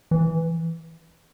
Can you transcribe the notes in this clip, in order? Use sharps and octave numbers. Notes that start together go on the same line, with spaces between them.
E3